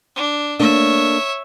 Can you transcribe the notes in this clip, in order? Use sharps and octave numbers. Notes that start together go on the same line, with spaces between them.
D4
A3 A#3 D4 C#5 E5